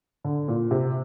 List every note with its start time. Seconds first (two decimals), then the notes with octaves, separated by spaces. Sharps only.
0.24 D3
0.48 A#2
0.71 C3